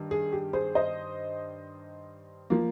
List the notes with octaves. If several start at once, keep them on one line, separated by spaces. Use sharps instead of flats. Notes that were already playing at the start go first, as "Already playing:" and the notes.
Already playing: G2 D#3
G#4
G4
G#4 C5
C5 D#5
F3 A#3